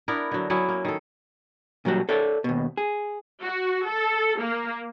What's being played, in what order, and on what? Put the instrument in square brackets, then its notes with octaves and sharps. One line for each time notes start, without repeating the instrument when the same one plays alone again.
[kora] B3 D4 E4 A#4
D3 F#3
F#3 B3 C#4 E4
A#3
D#3 A4
[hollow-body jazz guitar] A#2 F#3 G3 F#4
A4 C#5 D5 E5
D#2 B2
G#4
[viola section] F#4
A4
A#3